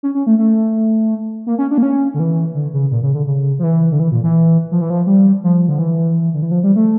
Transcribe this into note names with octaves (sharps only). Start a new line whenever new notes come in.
C#4
C#4
A3
A3
A#3
C#4
D4
A#3
C#4
D3
E3
D3
C#3
A#2
C#3
D3
C#3
F3
E3
D3
E3
A#2
E3
F3
E3
F3
G3
F3
D3
E3
D3
E3
F3
G3
A3